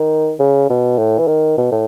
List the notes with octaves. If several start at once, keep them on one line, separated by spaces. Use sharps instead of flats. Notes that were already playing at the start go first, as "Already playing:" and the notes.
Already playing: D#3
C#3
B2
A2
E3
D#3
B2
A2